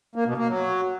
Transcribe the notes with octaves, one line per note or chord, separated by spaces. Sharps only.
A#3
B2
A#3
F#3